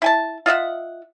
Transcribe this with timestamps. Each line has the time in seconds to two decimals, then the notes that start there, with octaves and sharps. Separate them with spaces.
0.02 E4 G#5 A5
0.46 F4 D#5 E5 F#5